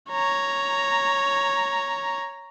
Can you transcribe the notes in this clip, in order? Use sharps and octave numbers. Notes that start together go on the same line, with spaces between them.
C#5 A#5